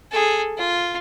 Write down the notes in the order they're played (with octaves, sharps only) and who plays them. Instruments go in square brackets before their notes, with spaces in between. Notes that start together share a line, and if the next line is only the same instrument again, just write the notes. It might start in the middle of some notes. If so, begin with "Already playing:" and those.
[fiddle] G#4 A4
F4